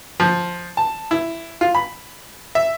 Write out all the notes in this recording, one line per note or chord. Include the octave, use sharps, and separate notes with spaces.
F3
A5
E4
F4
B5
E5